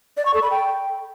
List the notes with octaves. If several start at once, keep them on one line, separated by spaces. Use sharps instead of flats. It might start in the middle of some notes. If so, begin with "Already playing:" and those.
D5
C#6
A4
B5
G5